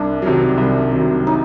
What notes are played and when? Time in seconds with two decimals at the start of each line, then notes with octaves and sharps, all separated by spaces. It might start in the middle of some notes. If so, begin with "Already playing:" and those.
Already playing: C2 D4
0.22 C3 D#3 F#3
0.58 C2
0.92 C3 D#3 F#3
1.27 D#4